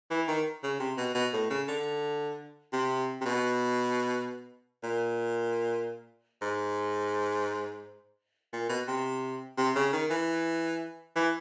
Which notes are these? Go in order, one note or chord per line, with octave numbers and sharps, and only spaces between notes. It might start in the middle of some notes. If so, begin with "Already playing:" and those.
E3
D#3
C#3
C3
B2
B2
A2
C#3
D3
C3
C3
B2
A#2
G#2
A#2
B2
C3
C3
C#3
D#3
E3
E3